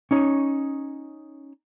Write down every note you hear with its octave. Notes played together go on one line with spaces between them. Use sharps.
C#4 D#4 C#5